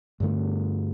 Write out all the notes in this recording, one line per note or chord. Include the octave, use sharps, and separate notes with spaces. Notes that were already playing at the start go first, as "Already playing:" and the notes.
G2 D3 A3